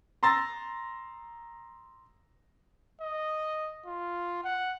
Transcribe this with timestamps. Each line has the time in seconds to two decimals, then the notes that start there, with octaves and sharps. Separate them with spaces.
0.23 A#5 C6 E6 A6 A#6
3.01 D#5
3.86 F4
4.44 F#5